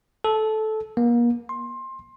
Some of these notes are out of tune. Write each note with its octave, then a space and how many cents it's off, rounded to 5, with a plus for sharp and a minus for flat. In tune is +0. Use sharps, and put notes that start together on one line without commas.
A4 -15
A#3 +35
C6 +20